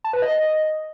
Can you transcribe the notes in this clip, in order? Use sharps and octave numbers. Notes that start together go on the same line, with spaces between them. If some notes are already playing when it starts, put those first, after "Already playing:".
A5
B4
D#5